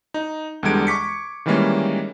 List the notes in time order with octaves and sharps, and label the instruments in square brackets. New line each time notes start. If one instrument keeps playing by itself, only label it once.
[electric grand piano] D#4
E2 D3 G3 G#3 G#6 D7
C#6 D6 B6 C#7
D#3 E3 G3 G#3 A#3 C#4